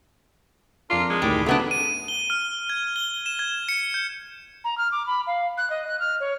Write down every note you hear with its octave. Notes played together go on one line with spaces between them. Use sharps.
F2 D4 F4 A#4 C6
G#3
D2 A2 D#3 G3 B5 D6
F#3 A3 B3 D4 D#6
D#7
G7
F6
G#6
G7
E7
G#6
C#7
G6
A#5
F6
D6
B5
F5
F#6
D#5
F#6
F6
C#5